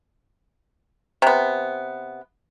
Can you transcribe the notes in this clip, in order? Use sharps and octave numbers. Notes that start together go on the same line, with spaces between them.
C3 B3